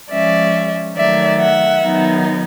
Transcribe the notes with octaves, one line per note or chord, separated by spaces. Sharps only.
F3 G#3 C#4 D5 E5
D#3 F#3 A3 D5 E5
E5 F#5
D#3 F#3 B3 D#4